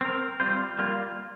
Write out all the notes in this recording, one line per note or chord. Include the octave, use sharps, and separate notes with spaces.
C4 A#4
G3 C4 F4 C5
G3 A#3 F4